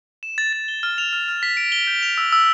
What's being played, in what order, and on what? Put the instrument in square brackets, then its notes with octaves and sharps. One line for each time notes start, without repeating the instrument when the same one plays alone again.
[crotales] E7
A6
A6
G7
F6
F7
F6
F6
B6
D7
G7
G6
F7
E6
E6